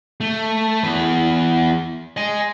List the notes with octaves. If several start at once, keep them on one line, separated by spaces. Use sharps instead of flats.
A3
E2 B4
D#5 G#5